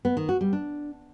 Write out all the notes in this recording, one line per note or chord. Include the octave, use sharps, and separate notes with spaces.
B3
D#3
F#4
G3
D4